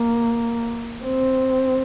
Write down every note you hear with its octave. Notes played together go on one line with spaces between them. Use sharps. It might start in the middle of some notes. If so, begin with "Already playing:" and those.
Already playing: A#3
C4